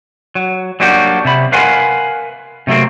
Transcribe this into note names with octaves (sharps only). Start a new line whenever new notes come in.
F#3
F#3 G3 A#3 D4 F#4 G4
C3 B5
A#4 B4 F5 F#5 G#5 C6
C3 F#3 A3 A#3 C4